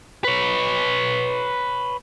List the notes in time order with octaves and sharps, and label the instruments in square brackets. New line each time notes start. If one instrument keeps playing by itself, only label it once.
[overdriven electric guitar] B4 C#5